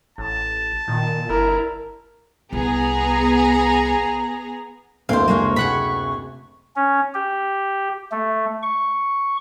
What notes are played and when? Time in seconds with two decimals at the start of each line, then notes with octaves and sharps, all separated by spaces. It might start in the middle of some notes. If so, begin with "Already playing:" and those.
0.18 A1 A5
0.88 A#2 D#3
1.29 G1 E4 A#4
2.53 C2 B3 G#4 A#5
5.09 F#1 D2 C4 C5 F5
5.28 C#3 G#3 A#3 C#6
5.56 C3 G#4 F#5 B5
6.76 C#4
7.14 G4
8.12 A3
8.63 C#6